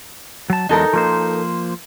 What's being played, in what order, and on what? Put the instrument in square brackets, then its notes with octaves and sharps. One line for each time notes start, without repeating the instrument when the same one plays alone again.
[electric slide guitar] F#3 A5
[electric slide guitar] E2 F#3 G#3 [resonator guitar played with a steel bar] D#4 A4 A#4
[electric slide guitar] F3 A#3 C5